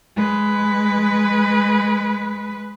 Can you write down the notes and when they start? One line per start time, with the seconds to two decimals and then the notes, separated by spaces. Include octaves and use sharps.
0.16 G#3 B4